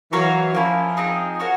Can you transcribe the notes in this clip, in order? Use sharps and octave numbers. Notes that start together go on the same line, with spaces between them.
E3 F#3 F#4 A#4 C#5 F5
F3 A#3 C#4 E4
C4 D#4 G#4
F#4 A#4 C#5 F#5